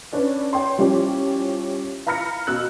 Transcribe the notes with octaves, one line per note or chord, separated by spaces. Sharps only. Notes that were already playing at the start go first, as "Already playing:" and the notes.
C#4 D4 B4
C#5 G5 C6
F3 G3 C#4 E4 G4
F5 A#5 B5 F6 A#6 C#7
B2 E6 F#6